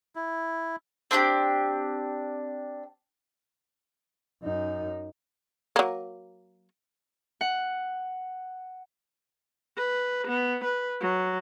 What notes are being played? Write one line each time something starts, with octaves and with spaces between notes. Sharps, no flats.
E4
C4 D4 F4 G4
F#2 D#4
F#3 A#3
F#5
B4
B3
B4
F#3